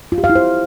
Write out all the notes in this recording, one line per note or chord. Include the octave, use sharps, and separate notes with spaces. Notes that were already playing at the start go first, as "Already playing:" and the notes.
F4
G4
F5
E4
C5